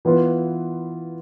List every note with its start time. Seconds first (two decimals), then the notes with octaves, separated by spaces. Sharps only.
0.05 E3 B3 F4 B4